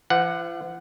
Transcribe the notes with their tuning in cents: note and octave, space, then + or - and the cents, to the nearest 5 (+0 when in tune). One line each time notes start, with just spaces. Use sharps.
F3 -45 F#5 +0